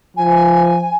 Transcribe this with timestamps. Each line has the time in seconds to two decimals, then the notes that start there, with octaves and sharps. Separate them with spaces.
0.17 F3 G#5